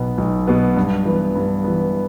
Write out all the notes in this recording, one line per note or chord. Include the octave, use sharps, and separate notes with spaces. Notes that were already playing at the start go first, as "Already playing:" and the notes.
Already playing: B1 B2 B3
B1
B2 B3
G2
E3 B3
G2
E3 B3